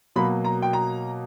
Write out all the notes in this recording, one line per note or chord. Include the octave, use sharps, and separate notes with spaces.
B2 F#3 A#3 B5
A#5
G5
A#5